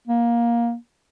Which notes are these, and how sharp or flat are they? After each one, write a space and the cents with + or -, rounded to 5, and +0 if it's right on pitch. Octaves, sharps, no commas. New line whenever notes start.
A#3 +15